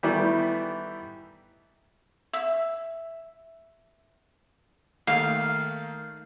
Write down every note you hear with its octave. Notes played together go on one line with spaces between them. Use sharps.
D#3 E3 G3 A3 B3 E4
E5
D#3 A3 A#3 F5